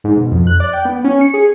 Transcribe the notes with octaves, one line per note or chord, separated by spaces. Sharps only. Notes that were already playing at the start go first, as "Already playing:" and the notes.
G#2
B2
F2
F#6
D5
G5
B3
C#4
C#7
G#4